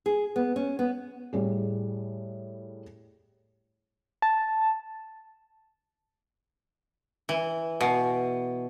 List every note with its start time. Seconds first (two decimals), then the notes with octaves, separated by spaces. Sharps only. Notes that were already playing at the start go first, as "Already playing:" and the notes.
0.06 G#4
0.36 B3
0.56 C#4
0.79 B3
1.33 A2 G3 G#4
4.22 A5
7.29 E3
7.81 B2